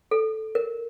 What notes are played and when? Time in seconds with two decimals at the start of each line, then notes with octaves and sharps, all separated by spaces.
0.11 A4
0.55 A#4